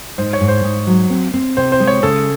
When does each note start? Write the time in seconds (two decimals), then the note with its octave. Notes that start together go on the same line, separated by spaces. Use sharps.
0.18 G#2 C5
0.33 C#5
0.41 G#2
0.48 C5
0.64 G#2
0.87 F#3
1.10 C4
1.34 C4
1.57 C3 C5
1.72 C5
1.80 G#3
1.87 C#5
2.03 C#3 A4